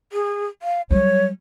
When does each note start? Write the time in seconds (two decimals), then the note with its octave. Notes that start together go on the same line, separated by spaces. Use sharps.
0.13 G#4
0.62 F5
0.91 F#3 G3 C#5